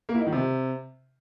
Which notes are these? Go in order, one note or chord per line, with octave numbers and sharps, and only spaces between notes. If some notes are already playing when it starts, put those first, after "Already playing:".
A#3
E4
D#4
D#3
C3